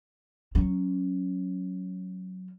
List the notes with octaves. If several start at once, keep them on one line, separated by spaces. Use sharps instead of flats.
F#3 C#4